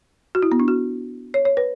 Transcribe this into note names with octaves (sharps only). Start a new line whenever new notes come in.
F#4
E4
B3
D4
F#4
C#5
C#5
B4